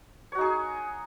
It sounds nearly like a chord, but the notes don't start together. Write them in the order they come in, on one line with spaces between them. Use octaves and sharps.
C#5 F#4 D#4 G#4